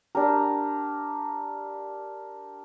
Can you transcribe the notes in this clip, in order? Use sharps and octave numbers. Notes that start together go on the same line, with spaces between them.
D4 G4 A#4